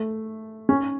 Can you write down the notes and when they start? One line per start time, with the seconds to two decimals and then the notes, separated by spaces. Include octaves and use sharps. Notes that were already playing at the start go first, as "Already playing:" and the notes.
Already playing: A3
0.69 C#4